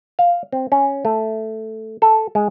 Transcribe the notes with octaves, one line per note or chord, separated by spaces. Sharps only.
F5
C4
C#4
A3
A4
G#3